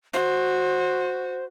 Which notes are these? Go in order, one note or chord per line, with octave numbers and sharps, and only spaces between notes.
F#4 C5